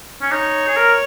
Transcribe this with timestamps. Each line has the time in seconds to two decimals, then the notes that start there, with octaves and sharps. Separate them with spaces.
0.22 C#4
0.31 D#4 C#5
0.67 G#4
0.76 A#4